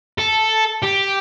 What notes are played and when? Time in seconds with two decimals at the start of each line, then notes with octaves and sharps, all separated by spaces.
0.18 A4
0.83 G4